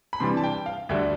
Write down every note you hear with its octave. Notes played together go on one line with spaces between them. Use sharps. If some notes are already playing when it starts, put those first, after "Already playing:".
B5
C3 E3 G3 D4 C6
A5
G5
F5
D2 D3 G3 E5